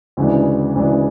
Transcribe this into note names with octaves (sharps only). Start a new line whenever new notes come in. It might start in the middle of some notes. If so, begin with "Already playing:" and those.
D2 C#3 E3 G#3 D4
D2 C#3 E3 G#3 D4